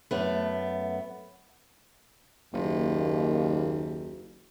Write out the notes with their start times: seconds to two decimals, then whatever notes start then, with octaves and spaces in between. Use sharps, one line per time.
0.11 F#2 A3 B3
2.54 F#1 D#2